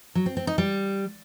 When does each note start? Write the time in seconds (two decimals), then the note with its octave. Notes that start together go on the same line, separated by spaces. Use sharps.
0.15 F#3
0.26 C4
0.37 C4
0.47 D#4
0.58 G3